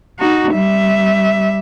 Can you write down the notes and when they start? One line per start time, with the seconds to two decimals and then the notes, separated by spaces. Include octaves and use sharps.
0.19 D#4 F#4
0.53 G3 E5